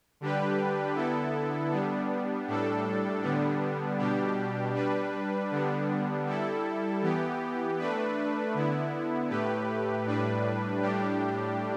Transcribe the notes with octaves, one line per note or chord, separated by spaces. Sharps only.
D3 G3 D4 G4 B4
D3 B3 E4 A4
G3 B3 D4
A2 G3 D4 A4
D3 G3 B3 D4
B2 G3 D4 G4
G3 D4 B4
D3 G3 B3 D4
G3 E4 A4
E3 B3 G4
A3 D4 B4
D3 B3 E4
A2 A3 G4 B4
A2 G3 D4 B4
A2 G3 D4 G4